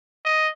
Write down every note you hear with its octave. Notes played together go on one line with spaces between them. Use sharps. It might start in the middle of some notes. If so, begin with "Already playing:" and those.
D#5